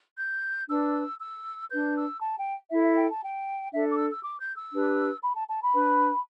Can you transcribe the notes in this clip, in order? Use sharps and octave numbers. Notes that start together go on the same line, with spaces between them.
G6
D4 B4 E6
E6
D4 B4 G6
E6
A5
G5
E4 A4 E5
E5
G5
A5
G5
D4 A4 E5
D6
E6
E6
D6
G6
E6
D4 G4 B4
B5
A5
A5
B5
D4 B4